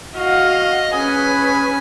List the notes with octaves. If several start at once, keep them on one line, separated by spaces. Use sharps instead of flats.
F#4 D#5 F5
C#4 G#4 B4 G#5